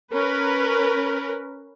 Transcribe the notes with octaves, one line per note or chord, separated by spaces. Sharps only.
C#4 A#4 B4